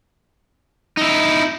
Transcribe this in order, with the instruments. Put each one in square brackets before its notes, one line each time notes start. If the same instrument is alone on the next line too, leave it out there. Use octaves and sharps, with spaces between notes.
[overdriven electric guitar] D#4 E4